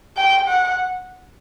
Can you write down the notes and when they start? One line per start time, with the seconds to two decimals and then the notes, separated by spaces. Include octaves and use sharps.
0.17 G5
0.48 F#5